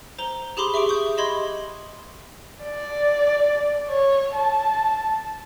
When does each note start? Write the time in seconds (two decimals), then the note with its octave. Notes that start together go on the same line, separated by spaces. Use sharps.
0.18 C5 A#5 G7
0.57 G4 G#4 B5 C6 D6
0.74 E5 C#6 D6 D7
0.89 C#6 D#6 G6
1.17 G4 D#5 B5 C6 G#6
2.63 D5
3.89 C#5
4.36 A5